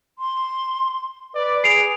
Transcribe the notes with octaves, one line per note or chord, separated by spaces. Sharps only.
C6
B4 D5
G#4 C7 D7 F7